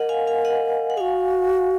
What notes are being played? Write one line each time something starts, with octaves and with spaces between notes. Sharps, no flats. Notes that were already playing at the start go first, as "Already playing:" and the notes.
Already playing: A#4 D#5 F#5
F5 G#5
F5 G#5
D#5 F#5
F#5
F#4 G#4 F5 G#5